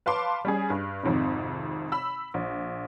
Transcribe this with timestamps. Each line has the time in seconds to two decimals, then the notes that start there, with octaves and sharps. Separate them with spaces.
0.06 B4 F5 A5 C6 D6
0.45 G3 C#4 G#4
0.70 G2
1.03 G#1 F2 G#2 C3
1.92 B5 E6
2.34 A#1